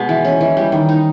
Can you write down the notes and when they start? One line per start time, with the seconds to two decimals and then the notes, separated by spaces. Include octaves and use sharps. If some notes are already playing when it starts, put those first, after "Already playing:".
Already playing: B2 G#3 B3
0.09 E3
0.24 C#4
0.41 E3
0.57 G3
0.72 D#3
0.89 D#4